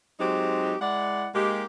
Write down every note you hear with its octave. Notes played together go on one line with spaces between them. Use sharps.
F#3 G#3 C4 D#4 G4
G#3 E4 D5 F#5
G#3 A#3 D#4 G4